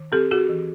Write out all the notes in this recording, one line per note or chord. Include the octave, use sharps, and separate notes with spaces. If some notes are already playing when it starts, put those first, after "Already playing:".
Already playing: D#3
C4 G4 A4
F#4 G#4
E3